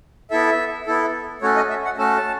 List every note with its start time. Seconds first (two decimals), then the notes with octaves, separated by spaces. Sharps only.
0.31 B3 E4 A4 E5
0.86 B3 E4 A4
1.42 A3 C#4 F#4 A4 C#5
1.56 D#5
1.70 E5
1.85 F#5
1.98 A3 C#4 F#4 A4 A5